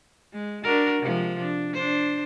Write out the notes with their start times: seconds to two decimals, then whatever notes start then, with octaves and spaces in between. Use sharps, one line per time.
0.34 G#3
0.64 D4 F#4 A#4
1.02 C3 F3 G#3
1.40 D4
1.74 D4 C5